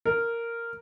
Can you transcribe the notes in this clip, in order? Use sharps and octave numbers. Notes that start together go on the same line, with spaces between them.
A#4